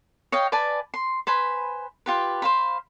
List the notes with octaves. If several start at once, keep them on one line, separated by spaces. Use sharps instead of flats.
C#5 D#5 F5 G5
B4 D5 G#5 A5
C6
B4 C5 G#5 B5
F4 G4 B4
C5 F5 B5